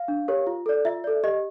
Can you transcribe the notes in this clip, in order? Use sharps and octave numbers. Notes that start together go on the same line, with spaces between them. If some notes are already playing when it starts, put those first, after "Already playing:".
Already playing: F5
D4
G4 A#4 C#5
F4
A4 D5
F4 E5
A4 D5
G4 D#5